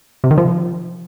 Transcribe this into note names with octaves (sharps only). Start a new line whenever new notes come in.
C3
D#3
F3